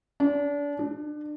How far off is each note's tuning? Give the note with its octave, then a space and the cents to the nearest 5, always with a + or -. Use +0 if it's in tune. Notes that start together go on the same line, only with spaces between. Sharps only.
D4 -30
D4 +30